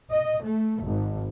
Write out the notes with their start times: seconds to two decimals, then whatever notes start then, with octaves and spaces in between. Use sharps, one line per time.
0.11 D#5
0.45 A3
0.81 G#1